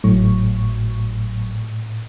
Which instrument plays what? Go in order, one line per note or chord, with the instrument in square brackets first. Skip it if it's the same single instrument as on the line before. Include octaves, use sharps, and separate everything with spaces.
[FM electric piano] G#1 F#3 C#6 [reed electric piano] A2